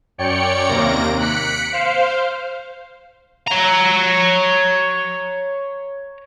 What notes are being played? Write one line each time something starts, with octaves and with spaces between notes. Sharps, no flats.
F#2 C#5 D5 G5 C#7
D#2 C3 A#3 A#6 D7
F#6 B6 C#7 D7
C5 F5
C#5 A#5